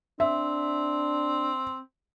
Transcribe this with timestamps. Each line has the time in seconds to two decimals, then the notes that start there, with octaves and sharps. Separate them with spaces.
0.20 C4 D4 E5